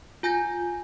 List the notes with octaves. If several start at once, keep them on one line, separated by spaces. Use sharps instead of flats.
F4 G#5 G6 A#6